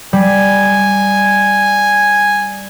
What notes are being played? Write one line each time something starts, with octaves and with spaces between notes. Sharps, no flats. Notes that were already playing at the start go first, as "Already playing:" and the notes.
G3 G#5